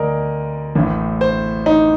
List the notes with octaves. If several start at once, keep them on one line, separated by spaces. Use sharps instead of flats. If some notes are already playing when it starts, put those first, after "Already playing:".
Already playing: D2 A#4 D5 D#5
A1 A2
C5
D#4